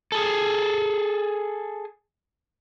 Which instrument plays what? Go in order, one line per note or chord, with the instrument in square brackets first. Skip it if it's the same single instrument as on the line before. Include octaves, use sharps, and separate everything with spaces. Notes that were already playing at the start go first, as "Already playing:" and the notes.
[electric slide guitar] G#4 A4